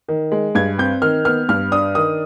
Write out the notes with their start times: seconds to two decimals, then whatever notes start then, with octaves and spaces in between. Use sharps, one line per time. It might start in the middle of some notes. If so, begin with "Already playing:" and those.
0.08 D#3
0.32 G#3
0.55 G2 G#6
0.78 C4 G6
1.02 D#3 F6
1.25 B3 F6
1.49 G2 F6
1.72 D4 D#6
1.95 D#3 D#6